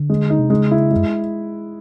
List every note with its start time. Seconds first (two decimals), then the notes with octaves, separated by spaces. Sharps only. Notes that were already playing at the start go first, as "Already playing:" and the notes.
Already playing: D3
0.10 G#3
0.30 D#4
0.39 C3
0.50 C#3 G#3
0.71 E4
0.91 F#2 G#3